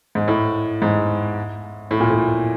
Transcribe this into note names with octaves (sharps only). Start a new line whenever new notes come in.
G#2
A2
G#2
A2
A#2
A2